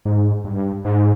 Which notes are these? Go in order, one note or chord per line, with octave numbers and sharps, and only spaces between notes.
G#2
G2
G#2